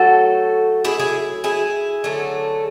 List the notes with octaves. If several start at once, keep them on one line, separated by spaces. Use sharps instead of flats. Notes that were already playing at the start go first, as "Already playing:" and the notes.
Already playing: F#3 A3 F#4 A4
E4 G#4
E4 G#4
E4 G#4
D3 F#3 A3